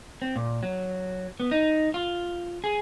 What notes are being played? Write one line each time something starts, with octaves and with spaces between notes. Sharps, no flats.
C4
A#2
F#3
B3
D#4
F4
G#4